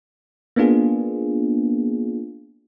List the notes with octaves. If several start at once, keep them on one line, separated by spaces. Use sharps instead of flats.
A#3 B3 D4 F4 G#4